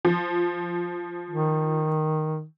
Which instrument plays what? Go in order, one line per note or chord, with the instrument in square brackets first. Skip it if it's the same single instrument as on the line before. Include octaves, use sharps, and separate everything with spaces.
[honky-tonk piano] F3
[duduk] D#3